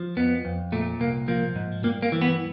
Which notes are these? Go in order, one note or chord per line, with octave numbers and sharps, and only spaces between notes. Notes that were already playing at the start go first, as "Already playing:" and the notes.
Already playing: F3
F2 B3
F2
A#2 A3
C2 A#3
F3 A#3
G#2
G2 A#3
A#3
E3
B3